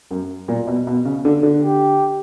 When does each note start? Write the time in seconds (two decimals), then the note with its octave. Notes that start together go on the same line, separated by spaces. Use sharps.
0.11 F#2
0.48 A#2
0.67 B2
0.87 B2
1.05 C#3
1.25 D3
1.43 D3
1.62 G4